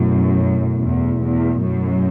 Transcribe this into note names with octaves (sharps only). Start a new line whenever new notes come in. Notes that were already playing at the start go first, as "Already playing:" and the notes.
Already playing: F#2 B2 A3 E4
E2
E2
F#2